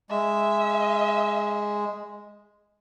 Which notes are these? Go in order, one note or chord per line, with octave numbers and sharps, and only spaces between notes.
G#3 E5